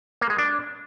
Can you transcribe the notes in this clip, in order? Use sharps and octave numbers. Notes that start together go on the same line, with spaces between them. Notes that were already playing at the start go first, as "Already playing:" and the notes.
A#3
G#3
D4